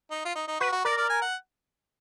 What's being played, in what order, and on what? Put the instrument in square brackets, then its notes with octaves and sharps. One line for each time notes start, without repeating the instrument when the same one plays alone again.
[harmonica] D#4
F4
D#4
D#4
[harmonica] F#4 [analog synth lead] B4
[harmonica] F#4
[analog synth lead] A#4 [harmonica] D5
[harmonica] D5
G#5
F#5